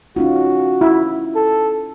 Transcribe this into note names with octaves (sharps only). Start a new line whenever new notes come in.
C#4 D#4 F4 F#4
E4
A4